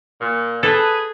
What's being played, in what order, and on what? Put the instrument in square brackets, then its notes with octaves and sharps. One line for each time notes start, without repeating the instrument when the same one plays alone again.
[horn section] A#2
[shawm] G#4 [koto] A4 [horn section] B4